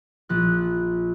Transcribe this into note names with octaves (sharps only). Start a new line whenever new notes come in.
A#1 F3 F#6